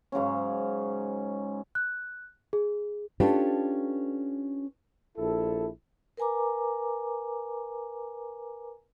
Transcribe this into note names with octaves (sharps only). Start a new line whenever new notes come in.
G#2 C#3 F#3 C#4
F#6
G#4
C#4 D4 F4 G4 A4 B4
A#1 E4 A4
A#4 B4 G#5 A#5 D6